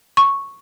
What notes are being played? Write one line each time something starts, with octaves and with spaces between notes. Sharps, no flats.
C#6